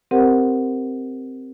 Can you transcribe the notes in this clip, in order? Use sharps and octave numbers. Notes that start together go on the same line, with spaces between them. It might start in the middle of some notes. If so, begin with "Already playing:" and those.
C4 G4 A#4 C5 F#5